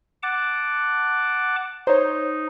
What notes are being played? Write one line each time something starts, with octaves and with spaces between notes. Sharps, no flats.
F#5 A5 D6
D#4 C5 C#5